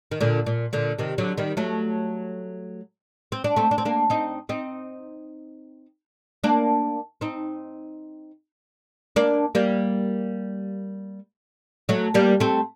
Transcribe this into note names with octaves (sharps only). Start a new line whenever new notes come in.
D#3
A#2 D3
A#2
A#2 D3
C3 D#3
D3 F#3
D#3 G3
F#3 A3
C4
D4
A3 C4
D4
C4
A#3 D4
C4 D#4
C4 D#4
A#3 D4
C4 D#4
A#3 D4
G3 A#3
F#3 A3
G3 A#3
A3 C4